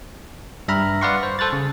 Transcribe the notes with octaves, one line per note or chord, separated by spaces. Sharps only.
G2 E5 A#5 B5 F6
B4 D5 F5 F#5 C6 C#6
C5
A4 C5 F#6 A6
C#3